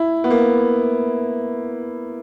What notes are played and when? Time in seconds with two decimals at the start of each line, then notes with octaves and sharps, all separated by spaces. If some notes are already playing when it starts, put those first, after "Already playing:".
Already playing: E4
0.24 B3
0.30 A#3